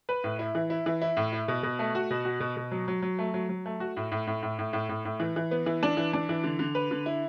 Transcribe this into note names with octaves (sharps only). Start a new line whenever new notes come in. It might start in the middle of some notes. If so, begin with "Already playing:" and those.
B4
A2
E4
E3
E4
E3
E4
A2
E4
B2
B2
A3
F#4
B2
F#4
B2
B2
F#3
F#3
F#3
A3
F#3
F#3
A3
F#4
A2
A2
A2
A2
A2
A2
A2
A2
E3
E3
B3
E3
D4
E3
D4
E3
D3
D3
B4
D3
E4